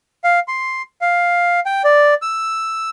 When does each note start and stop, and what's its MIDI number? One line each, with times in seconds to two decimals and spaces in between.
0.24 0.39 77
0.48 0.82 84
1.01 1.60 77
1.66 1.82 79
1.84 2.14 74
2.22 2.90 88